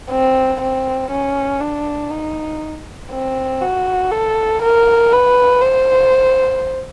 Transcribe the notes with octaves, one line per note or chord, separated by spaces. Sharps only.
C4
C4
C#4
D4
D#4
C4
F#4
A4
A#4
B4
C5